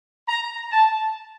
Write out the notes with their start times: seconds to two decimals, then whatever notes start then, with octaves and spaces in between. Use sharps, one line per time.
0.28 A#5
0.72 A5